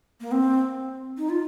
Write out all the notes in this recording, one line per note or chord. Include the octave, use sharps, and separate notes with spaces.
A#3
C4
D#4
F4